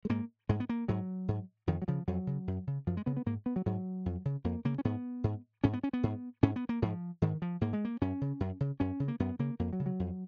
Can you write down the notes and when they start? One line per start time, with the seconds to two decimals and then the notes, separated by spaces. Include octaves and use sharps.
0.05 G#3
0.09 G#2 A#3
0.49 G#2 G#3
0.60 B3
0.69 A#3
0.88 G#2 F#3
1.28 G#2
1.67 F2 D#3
1.82 F#3
1.88 C#3 F3
2.08 F2 F#3
2.27 C#3
2.47 F#2
2.67 C#3
2.87 F#2 F3
2.97 G#3
3.06 C#3 B3
3.17 B3
3.26 G#2 A#3
3.46 B3
3.56 F#3
3.66 G#2 F#3
4.06 F2
4.25 C#3
4.44 F2 A#3
4.65 C#3 A#3
4.78 C#4
4.85 G#2 B3
5.24 G#2
5.64 G#2 C#4
5.73 B3
5.83 C#4
5.93 B3
6.03 G#2
6.43 G#2 C#4
6.56 B3
6.69 A#3
6.82 G#2 F3
7.22 G#2 D#3
7.42 F3
7.61 G#2 A#3
7.73 G#3
7.85 A#3
8.01 F#2 C#4
8.21 C#3
8.40 F#2
8.60 C#3
8.80 F#2 C#4
9.00 C#3
9.08 A#3
9.20 F#2 B3
9.39 C#3 A#3
9.59 F2 A#3
9.73 F#3
9.80 C#3
9.86 F#3
9.99 F2